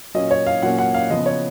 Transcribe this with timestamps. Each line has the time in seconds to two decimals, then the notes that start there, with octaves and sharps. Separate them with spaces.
0.15 A#2 F#3 A#3 C#4 D#5
0.31 C#5
0.47 F5
0.62 A#2 F#3 A#3 C#4 F#5
0.78 F#5
0.94 F5
1.10 C#3 F3 B3 D#5
1.26 C#5